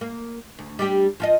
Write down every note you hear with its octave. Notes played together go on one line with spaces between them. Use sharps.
A#3
D2
G3 D4 G4
F3 F4 D#5